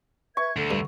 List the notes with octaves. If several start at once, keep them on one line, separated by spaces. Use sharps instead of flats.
B4 E5 C#6 G#6
D2 A4
G2